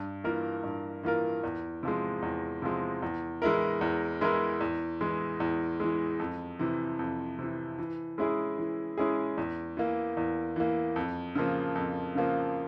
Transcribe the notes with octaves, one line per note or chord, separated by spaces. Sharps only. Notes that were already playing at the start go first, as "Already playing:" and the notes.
Already playing: G2
E3 A#3 F4 A#4
G2
E3 A#3 F4 A#4
E2
C3 F3 G#3
E2
C3 F3 G#3
E2
E3 G#3 E4 A#4
E2
E3 G#3 E4 A#4
E2
E3 G#3
E2
E3 G#3
F2
C3 E3
F2
C3 E3
E3
G#3 C#4 E4 G#4
E3
G#3 C#4 E4 G#4
E2
E3 A#3
E2
E3 A#3
F2
C#3 F3 A#3
F2
C#3 F3 A#3